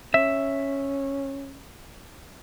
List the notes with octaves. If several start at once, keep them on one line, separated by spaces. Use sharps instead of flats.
C#4 E5